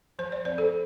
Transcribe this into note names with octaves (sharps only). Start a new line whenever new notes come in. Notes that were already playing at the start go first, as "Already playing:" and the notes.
F3 C5
D5
C4 C5
A4